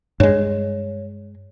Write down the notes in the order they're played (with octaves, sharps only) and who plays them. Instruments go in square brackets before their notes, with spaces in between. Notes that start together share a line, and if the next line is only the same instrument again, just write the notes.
[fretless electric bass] G2 G#3 [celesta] C#5